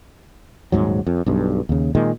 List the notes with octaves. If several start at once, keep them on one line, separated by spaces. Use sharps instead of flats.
D#1 G#1 G#2 F#3
F2
B1 G2
D#2 C#3
A#2 D#3 G#3